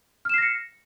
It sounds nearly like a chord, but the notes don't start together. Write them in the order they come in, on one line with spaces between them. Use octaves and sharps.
F6 E7 C7 A#6 C#7